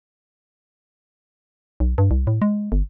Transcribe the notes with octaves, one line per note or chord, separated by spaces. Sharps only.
B1
G2
C2
A2
G#3
G1